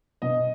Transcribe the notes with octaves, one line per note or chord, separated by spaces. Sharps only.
B2 D#5